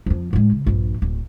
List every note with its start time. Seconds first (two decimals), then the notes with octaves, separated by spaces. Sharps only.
0.06 F2 F3
0.33 A2 G#3
0.52 C#3
0.66 A#1 G2
1.02 D1